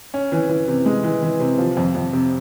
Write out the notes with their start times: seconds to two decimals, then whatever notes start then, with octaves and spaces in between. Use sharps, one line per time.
0.14 C#4
0.32 E3
0.49 E3
0.68 C3
0.86 G#3
1.03 E3
1.23 E3
1.40 C3
1.58 F3
1.77 F2
1.95 F2
2.13 C3